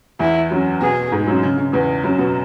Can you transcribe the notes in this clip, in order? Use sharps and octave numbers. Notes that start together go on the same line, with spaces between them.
E2 E3 E4
F#2 F#3
B2 B3 G#4
G#2 G#3
F#2 F#3
C#3
C#3
E2 E3
F#2 F#3
B2 B3